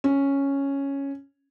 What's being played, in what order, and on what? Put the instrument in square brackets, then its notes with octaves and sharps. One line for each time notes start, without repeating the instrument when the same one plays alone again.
[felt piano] C#4